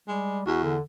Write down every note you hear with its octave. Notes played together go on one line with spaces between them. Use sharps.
G3 G#3
E2 F#4
D3